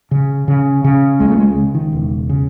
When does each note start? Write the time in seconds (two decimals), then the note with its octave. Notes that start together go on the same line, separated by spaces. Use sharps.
0.11 C#3
0.48 C#3
0.84 C#3
1.20 C#2 G#3
1.30 A3
1.38 G#3
1.56 C#2
1.75 D#3
1.92 E1
2.29 C#3